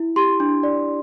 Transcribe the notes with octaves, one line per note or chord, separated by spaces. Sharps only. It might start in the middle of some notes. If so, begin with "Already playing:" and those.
Already playing: E4
G4 C6
D4
D5